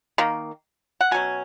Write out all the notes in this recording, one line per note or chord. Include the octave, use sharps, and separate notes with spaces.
D#3 A#3
F#5
B2 F#3 C#4 G#5